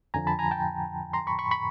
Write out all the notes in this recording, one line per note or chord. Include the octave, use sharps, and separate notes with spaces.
F2 D3 F3 G#5 A#5
A5 B5
G#5 A#5
G5 A5
A#5 C6
B5 C#6
B5 C#6
B5 C#6